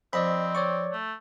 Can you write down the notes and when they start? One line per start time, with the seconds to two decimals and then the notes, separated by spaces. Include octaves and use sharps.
0.13 F2 C4 D5 D#5 B5
0.55 C#5 D5 C#6
0.93 A3